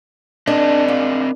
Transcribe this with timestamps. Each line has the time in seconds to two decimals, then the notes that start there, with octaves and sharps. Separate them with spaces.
0.47 C4 D4 A#4 D#5
0.88 F4